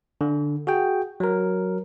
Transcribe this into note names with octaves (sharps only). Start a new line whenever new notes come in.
D3
F#4 G#4 G5
F#3 A#4